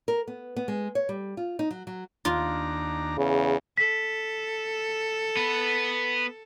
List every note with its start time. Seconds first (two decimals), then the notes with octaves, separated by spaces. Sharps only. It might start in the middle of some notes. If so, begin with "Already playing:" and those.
0.08 A#4
0.28 B3
0.56 B3
0.68 G#3
0.95 C#5
1.09 G3
1.37 F4
1.59 D#4
1.71 F#3
1.87 F#3
2.25 D#2 D4 F4 A#5
3.17 E2 C#3
3.77 A4 B6
5.37 B3 B4